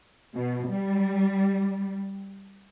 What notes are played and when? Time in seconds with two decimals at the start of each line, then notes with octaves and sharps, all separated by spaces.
0.36 B2
0.70 G3